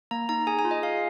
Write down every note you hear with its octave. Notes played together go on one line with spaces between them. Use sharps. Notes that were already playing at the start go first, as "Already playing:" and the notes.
A#3 A#5
D#4 A#5
G#4 G#5
G#5
F4
D#5
G#4 F5